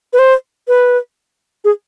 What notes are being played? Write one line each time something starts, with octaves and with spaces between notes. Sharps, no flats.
B4
C5
B4
G#4